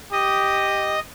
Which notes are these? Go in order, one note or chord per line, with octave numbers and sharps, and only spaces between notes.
G4 D#5